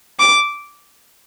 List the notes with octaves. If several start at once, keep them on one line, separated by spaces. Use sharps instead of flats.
D6